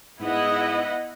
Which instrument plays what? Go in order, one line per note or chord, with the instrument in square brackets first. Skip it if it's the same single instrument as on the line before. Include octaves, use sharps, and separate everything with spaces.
[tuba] G#2 [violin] B3 F#5 [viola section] E4 D#5